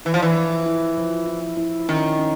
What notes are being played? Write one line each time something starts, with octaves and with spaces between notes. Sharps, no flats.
E3 E4
F3
E3
F3
E4
F3
E4
E4
D#3 C#4
C#4